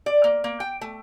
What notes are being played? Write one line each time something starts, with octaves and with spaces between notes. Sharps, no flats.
D5
A#3
A#3
G5
A3